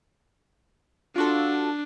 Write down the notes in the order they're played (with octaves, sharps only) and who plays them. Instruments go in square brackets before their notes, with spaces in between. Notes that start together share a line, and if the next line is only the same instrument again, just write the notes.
[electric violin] D4 [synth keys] F4 F#4 A4